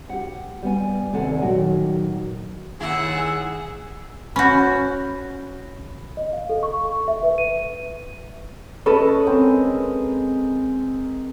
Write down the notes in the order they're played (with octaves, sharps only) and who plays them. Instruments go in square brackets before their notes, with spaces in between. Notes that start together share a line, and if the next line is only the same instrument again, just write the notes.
[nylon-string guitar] G4 F#5
G3 B3 F#5 G#5
D#2 C3 A4 D5 F#5 G#5
A#2 D#3 F#3 F#4 G4
[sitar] D#2 E4 [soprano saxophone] G#4 [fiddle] F#5 [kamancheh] G#5 E6
[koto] C#4 F#4 [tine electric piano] B5 G6
[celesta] D#5
F5
A4
C#6
E5
B4
D#7
[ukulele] C#4 A4 C#5 [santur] B4 D#5
[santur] G#3 C4 A#4